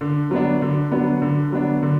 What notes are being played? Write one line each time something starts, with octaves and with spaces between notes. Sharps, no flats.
D3
F#3 B3 D4
D3
F#3 B3 D4
D3
F#3 B3 D4
D3